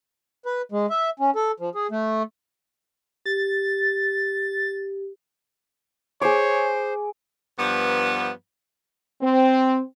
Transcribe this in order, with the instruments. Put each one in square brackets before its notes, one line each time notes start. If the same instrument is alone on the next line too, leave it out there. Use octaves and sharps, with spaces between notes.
[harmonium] B4
G#3
E5
C#4
A4
F3
G#4
A3
[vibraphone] G4 [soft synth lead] A6
[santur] G#4 D6 [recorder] C5 [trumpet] C#5
[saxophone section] G2 F3 B3
[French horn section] C4